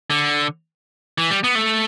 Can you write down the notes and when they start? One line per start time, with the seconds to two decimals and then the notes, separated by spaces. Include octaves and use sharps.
0.10 D3
1.18 E3
1.30 G3
1.44 B3
1.55 A3